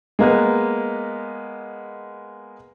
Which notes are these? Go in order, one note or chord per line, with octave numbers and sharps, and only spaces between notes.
G#3 A#3 B3